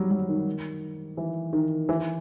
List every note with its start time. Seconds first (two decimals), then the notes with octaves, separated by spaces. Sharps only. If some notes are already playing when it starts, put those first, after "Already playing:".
Already playing: F#3 G3
0.11 F#3
0.29 D#3
1.17 E3
1.53 D#3
1.89 E3